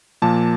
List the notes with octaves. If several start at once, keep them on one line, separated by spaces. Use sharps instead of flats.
A#2 F3 A#3 A5